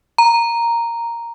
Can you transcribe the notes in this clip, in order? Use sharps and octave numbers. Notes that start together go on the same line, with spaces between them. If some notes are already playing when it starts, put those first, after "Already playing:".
A#5